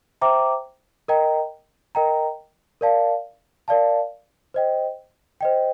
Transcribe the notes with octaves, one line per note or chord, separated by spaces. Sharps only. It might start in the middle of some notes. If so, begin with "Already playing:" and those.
C5 E5 G5 A#5 D6
A#4 D#5 G5 A#5
A#4 D#5 G5 A#5
A#4 D5 F5 A5
A#4 D5 F5 A5
C5 D#5 G5
C5 D#5 G5